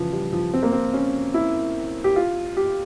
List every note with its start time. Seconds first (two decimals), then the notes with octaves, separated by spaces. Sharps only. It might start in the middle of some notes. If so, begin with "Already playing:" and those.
Already playing: C#3 E3 F3
0.12 G3
0.33 F3
0.54 C4
0.63 A#3
0.72 C4
0.94 C#4
1.34 E4
2.04 G4
2.16 F4
2.57 G4